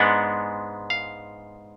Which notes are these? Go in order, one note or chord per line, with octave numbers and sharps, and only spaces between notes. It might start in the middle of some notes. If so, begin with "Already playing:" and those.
Already playing: G#2 G#3 B3 D4 F#5
F5